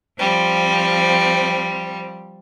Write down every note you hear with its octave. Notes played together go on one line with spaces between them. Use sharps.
F3 G3 C4